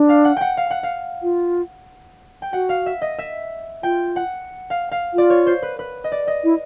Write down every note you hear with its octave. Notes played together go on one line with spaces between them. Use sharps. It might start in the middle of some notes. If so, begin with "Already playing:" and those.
Already playing: D4
F5
F#5
F#5 G5
F5
F#5
F5
F4
G5
F#4 F#5
F5
E5
D#5
E5
F4 G5
F#5
F5
F5
F4 D5
C#5
C5
B4
B4
D#5
D5
D#5
E4